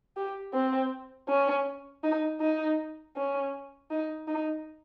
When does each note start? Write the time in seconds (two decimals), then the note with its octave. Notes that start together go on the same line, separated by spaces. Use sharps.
0.17 G4
0.54 C4
1.29 C#4
2.04 D#4
2.41 D#4
3.17 C#4
3.91 D#4
4.28 D#4